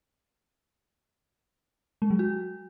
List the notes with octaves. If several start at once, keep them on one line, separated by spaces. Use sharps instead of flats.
G#3
F#3
F#4